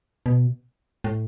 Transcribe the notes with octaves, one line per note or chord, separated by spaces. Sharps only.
B2
A2